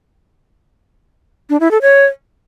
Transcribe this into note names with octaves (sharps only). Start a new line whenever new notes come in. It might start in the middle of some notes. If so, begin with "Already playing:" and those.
D4
E4
A4
C#5